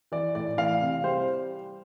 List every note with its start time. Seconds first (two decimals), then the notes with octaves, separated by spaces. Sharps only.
0.12 E3 D5
0.35 A2 D5
0.58 E3 F5
0.81 C3
1.04 G3 C5